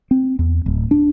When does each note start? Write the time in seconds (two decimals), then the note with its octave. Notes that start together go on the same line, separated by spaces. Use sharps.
0.11 C4
0.39 E2
0.66 D1
0.91 D4